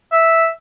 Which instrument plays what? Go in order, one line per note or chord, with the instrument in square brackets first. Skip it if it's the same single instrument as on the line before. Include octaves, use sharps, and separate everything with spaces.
[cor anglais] E5